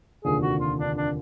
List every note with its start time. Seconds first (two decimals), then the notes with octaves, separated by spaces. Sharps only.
0.24 F1 D#2 D3 F3 G#4
0.42 F#4
0.61 F4
0.79 D4
0.97 D4